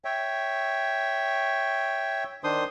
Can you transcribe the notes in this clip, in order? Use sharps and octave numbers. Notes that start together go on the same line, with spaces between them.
C#5 E5 G5
D#3 D4 C5 C6 D#6